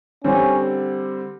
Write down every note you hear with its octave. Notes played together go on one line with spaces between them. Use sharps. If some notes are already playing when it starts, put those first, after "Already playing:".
D3 G3 C4 C#4